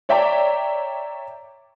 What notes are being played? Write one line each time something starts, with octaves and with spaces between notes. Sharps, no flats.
C#5 D5 E5 G5 A#5 D6